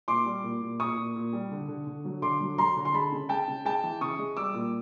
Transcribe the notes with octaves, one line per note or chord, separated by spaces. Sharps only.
A#2 C6 D6
G3
A#2
A#2
A#2 C#6 D#6
A#2
A#2
G3
D3
D3
D3
F#3
D3 C6 D6
F#3
F#3 A#5 C6
D3
C6
G#3 A5 B5
C#3
G#3 G5 A5
C#3
G#3 G5 A5
E3
C#3 C#6 D#6
G#3
G3 D6 E6
A#2